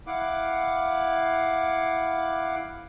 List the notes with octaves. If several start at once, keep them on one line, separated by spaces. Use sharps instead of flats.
E4 F5 F#5 D6